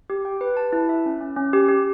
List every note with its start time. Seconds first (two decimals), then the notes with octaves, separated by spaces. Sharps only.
0.10 G4
0.25 G5
0.41 B4
0.57 A5
0.73 E4
0.89 E5
1.06 C#4
1.21 C#4
1.37 C#4
1.53 G4
1.69 G4